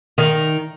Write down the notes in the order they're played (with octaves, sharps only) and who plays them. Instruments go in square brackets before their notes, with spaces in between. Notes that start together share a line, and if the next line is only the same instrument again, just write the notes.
[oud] D#3